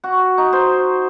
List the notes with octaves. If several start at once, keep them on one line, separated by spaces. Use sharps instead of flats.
F#4
D#4
C5